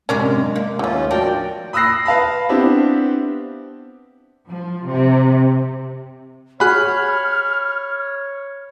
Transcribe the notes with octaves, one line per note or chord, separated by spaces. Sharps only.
F#2 C3 G#3 C#4 D4 A#4 D5
A#3
D#2 D3 E3 A3 C#4 F4
F3 D4 F#4 A#4 D5 G5
B5 D#6 E6 F#6 A#6 C7
B4 F5 A5 B5
B3 C4 D4 E4 G4
F3
C3
F#4 G#4 C#5 B5 F6 F#6